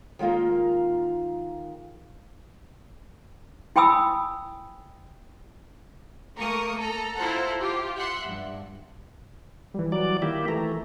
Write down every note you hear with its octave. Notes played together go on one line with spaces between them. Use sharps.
D#3 G#3 A#3 F4
E4 G5 G#5 B5 D#6 E6
A3 A#3 A#4 C#6 D#6
A4 A#5
E4 F4 A4 C5 F#5 A#5
F4 G4
E5 F#5 C6
G2
E3 G3
F#3 D5
D#3 A#3 E4 G4
E3 A3 A#5